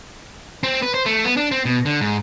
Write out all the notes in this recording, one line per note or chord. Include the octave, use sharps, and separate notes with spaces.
C4
B4
C5
A3
B3
D4
C4
B2
D3
G#2